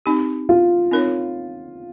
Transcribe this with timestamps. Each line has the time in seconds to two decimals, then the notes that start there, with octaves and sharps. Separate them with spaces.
0.06 C4 D#4 G4
0.49 F4
0.91 C4 D#4 A#4 C#5